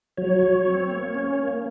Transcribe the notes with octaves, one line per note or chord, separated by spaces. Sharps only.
F#3 C#5
F#3
C4
A#3
C#4
A#3